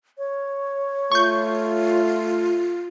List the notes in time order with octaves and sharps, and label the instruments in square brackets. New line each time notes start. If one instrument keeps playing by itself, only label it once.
[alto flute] C#5
[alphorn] A3 [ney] F4 [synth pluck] C#6 G6